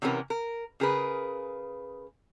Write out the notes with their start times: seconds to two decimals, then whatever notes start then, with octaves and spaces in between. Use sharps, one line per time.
0.02 C3 E3 B3 C#4 G4 A#4
0.30 A#4
0.80 C#3 G#4 A#4 B4